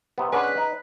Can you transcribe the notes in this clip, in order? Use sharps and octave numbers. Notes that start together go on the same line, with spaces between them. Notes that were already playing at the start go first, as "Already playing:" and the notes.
C3 B3
G#3 C#4 D4 B4 F#5 G#5
F#6 B6
D#4